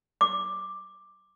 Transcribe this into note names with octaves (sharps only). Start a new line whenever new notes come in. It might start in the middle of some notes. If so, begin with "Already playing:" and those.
D6